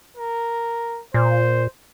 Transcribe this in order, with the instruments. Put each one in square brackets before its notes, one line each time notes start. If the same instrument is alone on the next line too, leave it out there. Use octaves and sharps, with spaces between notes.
[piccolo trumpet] A#4
[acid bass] A#2 [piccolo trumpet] C5